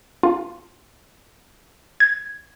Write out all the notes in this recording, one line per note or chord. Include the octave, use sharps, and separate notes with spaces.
F4
G#6